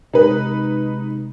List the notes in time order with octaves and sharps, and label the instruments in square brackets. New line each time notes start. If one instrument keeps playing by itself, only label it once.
[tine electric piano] C3 G#3 [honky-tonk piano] D#4 B4